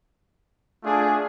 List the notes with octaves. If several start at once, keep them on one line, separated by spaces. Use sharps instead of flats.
A3 D4 F4 G#4